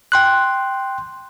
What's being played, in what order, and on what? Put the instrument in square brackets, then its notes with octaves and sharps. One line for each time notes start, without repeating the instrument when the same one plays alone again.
[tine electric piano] G5 C6 F#6